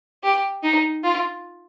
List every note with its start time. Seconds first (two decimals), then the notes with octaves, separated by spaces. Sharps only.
0.23 G4
0.63 D#4
1.03 F4